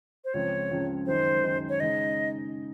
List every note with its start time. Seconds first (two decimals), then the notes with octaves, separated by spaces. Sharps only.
0.25 C5
0.34 C#2 C#3 F3 C4 C#5
0.70 C#2 C#3 F3 C4
1.06 F#2 D#3 G#3 D#4 C5
1.43 F#2 D#3 G#3 D#4
1.69 C#5
1.80 C#3 G#3 D#4 D#5